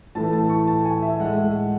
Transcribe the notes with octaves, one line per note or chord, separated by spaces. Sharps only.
A2 E3 A3 A5
A5
C#6
A5
G#5
E5
A2 G#3 F#5